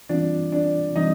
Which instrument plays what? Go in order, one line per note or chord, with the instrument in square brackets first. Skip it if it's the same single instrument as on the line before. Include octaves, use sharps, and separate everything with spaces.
[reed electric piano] E3 G3 C4 F4 [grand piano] D4 D5
[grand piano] D4 D5
[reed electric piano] E3 G3 C4 [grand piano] D#4 D#5